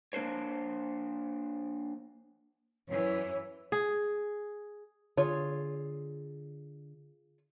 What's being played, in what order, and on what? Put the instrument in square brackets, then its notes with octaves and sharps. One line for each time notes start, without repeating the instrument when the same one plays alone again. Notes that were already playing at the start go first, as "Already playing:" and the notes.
[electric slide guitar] A#3 D4 A#4 C5 C#5
[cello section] F#2 E3 [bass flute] C#5
[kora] G#4
[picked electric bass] D3 [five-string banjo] F4 G#4 C#5